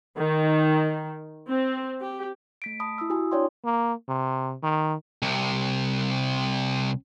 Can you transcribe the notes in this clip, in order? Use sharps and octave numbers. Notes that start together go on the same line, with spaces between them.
D#3
C4
G4
A3 B6 D7
A5 B5 D#6
E4 D#6 E6
E4 F#4 G4 G#5 D#6
D4 E4 C#5 D5 G5 C6
A#3
C3
D#3
C2 C3